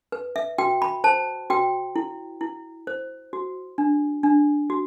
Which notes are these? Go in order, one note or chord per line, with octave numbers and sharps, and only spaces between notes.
B4
E5
F#4 G5
B5
C5 A5
F#4 G5
E4
E4
C5
F#4
D4
D4
F#4